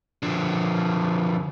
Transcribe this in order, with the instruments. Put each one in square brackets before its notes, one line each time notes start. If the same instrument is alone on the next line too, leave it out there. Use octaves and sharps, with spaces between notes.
[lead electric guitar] D3 F3